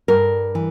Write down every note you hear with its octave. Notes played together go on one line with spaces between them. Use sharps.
G2 A#4
E3